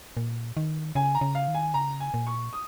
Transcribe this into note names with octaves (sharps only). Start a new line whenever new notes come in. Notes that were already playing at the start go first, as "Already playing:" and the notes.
A#2
D#3
C#3 G#5
A#5
C#3
F5
D#3
G#5
C#3 A#5
G#5
A#2
C#6
D#6